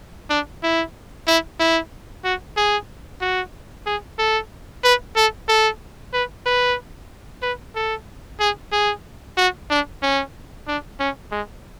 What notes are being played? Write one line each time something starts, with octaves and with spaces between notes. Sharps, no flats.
D4
E4
E4
E4
F#4
G#4
F#4
G#4
A4
B4
A4
A4
B4
B4
B4
A4
G#4
G#4
F#4
D4
C#4
D4
C#4
G#3